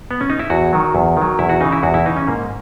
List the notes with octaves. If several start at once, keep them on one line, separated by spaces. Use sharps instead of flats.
B3
C#4
D#4
E4
E2 F#4
D#3 F#3
E2
D#3 F#3
E2 E4
F#4
C#3 E3 D#4
E4
E2 F#4
E4
C#3 E3 D#4
C#4
G#2 A#3